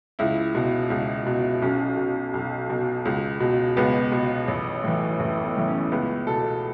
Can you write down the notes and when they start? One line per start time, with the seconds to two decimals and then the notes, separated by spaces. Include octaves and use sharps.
0.19 C#2 E4
0.55 B2
0.90 C#2
1.27 B2
1.62 B1 C#4
1.97 B2
2.33 B1
2.70 B2
3.05 C#2
3.40 B2
3.77 C#2 B3
4.12 B2
4.48 A1
4.84 A2 E3
5.19 A1 A3
5.43 B3
5.56 A2 E3
5.68 C#4
5.92 C#2 B3
6.27 B2 A4